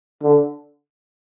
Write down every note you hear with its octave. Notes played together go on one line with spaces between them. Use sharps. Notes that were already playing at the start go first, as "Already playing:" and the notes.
D3